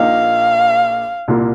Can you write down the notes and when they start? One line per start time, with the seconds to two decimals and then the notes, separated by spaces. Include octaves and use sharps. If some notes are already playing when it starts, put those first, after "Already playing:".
Already playing: A#1 A#2 A#3 D#4 F5
1.28 C2 A#2 A#3 F4